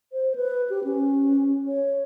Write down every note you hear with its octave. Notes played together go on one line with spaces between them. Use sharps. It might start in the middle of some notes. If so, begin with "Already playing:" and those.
C5
B4
G4
C#4
C#5